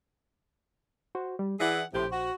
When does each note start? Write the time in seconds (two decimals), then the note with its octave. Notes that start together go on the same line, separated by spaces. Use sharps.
1.15 F#4 C5
1.39 G3
1.60 E3 E4 G#4 D5 E5 F#5
1.93 A#1 A2 C3 G4 C5
2.12 F#4